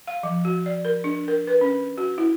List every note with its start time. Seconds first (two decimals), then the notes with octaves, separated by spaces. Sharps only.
0.07 F5
0.23 F3
0.45 F#4
0.66 D5
0.85 A#4
1.04 D4
1.28 A#4
1.47 B4
1.61 C#4
1.98 F#4
2.18 E4